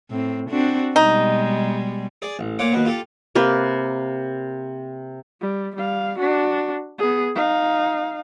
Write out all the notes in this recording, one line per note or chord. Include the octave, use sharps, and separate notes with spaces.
A2 C4
C4 D4 F#4
B2 G3 G#3 D#4
G#4 D5
A1
A#2 F4 C#5 F#5 D6
D#2 B2 B3
F4 G4 A4
C3 A#3 G4 B4
G3
G3 F5
D4 F#4
B3 G#4
D#4 F5